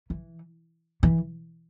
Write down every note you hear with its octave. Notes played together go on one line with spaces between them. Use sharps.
E3
E3